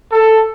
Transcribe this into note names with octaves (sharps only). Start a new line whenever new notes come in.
A4